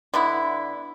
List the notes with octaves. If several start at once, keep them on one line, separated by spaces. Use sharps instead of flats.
D3 B3 E4